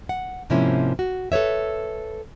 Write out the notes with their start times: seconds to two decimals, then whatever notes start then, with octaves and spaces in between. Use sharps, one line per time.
0.09 F#5
0.50 G#2 C3 F3 A#3 C#4 E4
0.99 F#4
1.32 A4 B4 C#5 E5